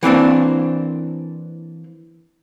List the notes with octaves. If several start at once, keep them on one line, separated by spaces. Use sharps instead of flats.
E3 A#3 C4 D4